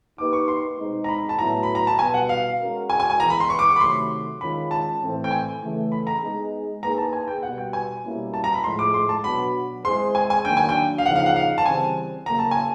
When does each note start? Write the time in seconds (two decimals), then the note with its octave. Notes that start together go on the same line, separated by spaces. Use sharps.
0.18 A#3 D#4 G4 B4 D6
0.33 C#6
0.48 C6
0.78 B2 G#3 C4 D#4
1.04 A#5
1.09 B5
1.29 A5
1.38 A2 F#3 B3 E4 A#5
1.63 B5
1.75 A#5
1.87 A5
1.99 B2 G#5
2.01 G3 B3
2.14 F#5
2.29 F5
2.59 G#3 C#4 F#4 A#4
2.90 G#5
3.00 G#5
3.10 G#5
3.20 E3 G#3 B3 E4 G#4 A#5
3.30 B5
3.40 C6
3.50 C#6
3.59 D6
3.68 C#6
3.76 B5
3.80 C3 D#3 F#3 A3 C6
4.41 D#3 G#3 C#4 F4 B5
4.71 A5
5.01 A2 E3 A3 C4
5.24 G5
5.31 G#5
5.62 C#3 E3 A3
5.92 B5
6.07 A#5
6.22 G#3 B3 D#4 G#4
6.82 A#3 D#4 G#4 B4 A#5
6.98 A5
7.13 G#5
7.28 G5
7.43 B2 G3 B3 F#5
7.58 G5
7.73 G#5
8.04 B2 G3 A#3 C#4 E4
8.34 A5
8.44 A#5
8.54 B5
8.64 A2 F3 G#3 C6
8.79 D6
8.94 C6
9.09 A5
9.24 B2 F#3 B3 D4 F#4 B5
9.85 G#3 C4 E4 G#4 C5 C6
10.15 G#5
10.30 G#5
10.45 D#3 F#3 A#3 D4 G5
10.57 G#5
10.69 G5
10.98 F5
11.06 C#3 F3 A#3 D#4 F#5
11.16 F5
11.26 F#5
11.36 F5
11.58 A5
11.66 C#3 E3 G3 C4 G#5
12.26 C#3 F#3 A#3 A#5
12.39 A5
12.51 G#5